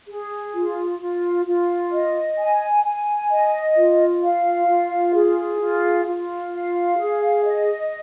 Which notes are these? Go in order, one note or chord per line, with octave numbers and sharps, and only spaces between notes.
G#4
F4
F4
F4
D#5
G#5
G#5
D#5
F4
F5
F4
G#4
F4
F4
F5
G#4
D#5